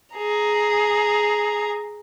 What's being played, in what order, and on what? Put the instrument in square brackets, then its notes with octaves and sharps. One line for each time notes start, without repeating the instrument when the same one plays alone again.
[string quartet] G#4 A#5